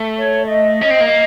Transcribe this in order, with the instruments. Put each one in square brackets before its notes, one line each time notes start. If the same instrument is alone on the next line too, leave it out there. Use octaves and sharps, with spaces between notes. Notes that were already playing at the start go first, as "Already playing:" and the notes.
Already playing: [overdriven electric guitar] A3
[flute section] C#5
D#5
[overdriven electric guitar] C#4
C4
A#3